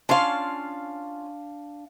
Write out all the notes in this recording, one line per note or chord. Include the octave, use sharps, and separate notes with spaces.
C#4 D4 F4 F5 C6